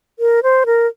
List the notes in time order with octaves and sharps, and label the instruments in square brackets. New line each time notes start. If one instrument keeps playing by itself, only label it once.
[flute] A#4
C5
A#4